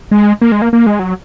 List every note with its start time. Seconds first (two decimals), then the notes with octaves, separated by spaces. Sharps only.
0.11 G#3
0.41 A#3
0.52 G#3
0.62 A#3
0.73 A#3
0.87 G#3
0.99 F#3